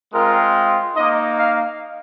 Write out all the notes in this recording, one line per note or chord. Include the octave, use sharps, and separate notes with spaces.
G#3 C4 F4 A#4
A#3 D#4 D#5
F5